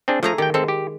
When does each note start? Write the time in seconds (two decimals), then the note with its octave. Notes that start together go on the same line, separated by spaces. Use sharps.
0.08 C4 D4 G#4
0.23 F3 A3 G#4 A#5
0.38 D#3 G4 G5
0.54 G#3 C4 A4
0.68 G4